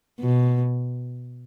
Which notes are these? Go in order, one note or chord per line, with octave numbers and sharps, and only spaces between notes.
B2